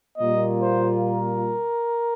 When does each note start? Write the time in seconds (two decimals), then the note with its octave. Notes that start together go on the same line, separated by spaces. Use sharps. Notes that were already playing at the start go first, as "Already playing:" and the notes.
0.18 A#2 G3 A#3 F4 D#5
0.61 C5
1.04 A#4